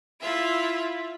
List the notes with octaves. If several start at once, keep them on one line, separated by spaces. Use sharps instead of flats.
E4 F4 E5